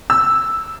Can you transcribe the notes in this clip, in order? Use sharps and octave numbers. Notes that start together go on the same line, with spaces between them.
E6